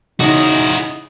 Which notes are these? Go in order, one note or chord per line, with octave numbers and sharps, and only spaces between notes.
C#3 D#4 E4 F#4 D#5